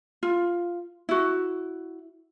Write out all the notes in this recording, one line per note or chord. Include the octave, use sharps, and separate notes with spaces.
F4
E4 F#4